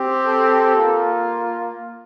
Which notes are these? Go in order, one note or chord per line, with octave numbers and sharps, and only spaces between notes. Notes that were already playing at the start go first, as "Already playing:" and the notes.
Already playing: C4 G4
A4
A#3 F4